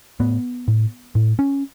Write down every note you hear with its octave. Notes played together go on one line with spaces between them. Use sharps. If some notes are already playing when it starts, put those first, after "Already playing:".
A2 B3
A2
A2
C#4